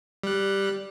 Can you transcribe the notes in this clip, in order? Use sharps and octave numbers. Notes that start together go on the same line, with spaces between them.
G3 F#6